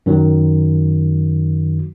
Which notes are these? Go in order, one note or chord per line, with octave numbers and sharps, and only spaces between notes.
F#2 D#3 F#3